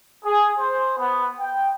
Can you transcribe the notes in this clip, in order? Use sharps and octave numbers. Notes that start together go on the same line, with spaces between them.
G#4
C5
B3
G5